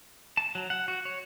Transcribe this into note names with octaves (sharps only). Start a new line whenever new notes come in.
A5
F#3
F#5
F#4
C#5